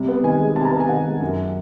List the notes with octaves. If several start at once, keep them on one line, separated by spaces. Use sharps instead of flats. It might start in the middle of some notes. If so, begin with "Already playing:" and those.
Already playing: C3 G3
B3
D#3 G#5
G#3
C3 A5
A#5
B3 A5
G#5
D#3 F#5
G#3
F#2